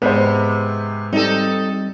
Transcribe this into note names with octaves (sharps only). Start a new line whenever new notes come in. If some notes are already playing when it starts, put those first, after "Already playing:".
G#2 C3 B3 B4 C5
G3 C4 D#4 A4